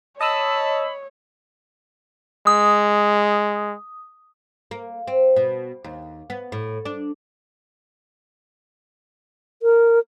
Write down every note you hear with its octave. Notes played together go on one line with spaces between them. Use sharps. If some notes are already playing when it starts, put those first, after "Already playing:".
C#5 D#5 A5 B5 D#6 E6
G#3 D#6
A#3
C4
B2
D#2
B3
A2
D4
A#4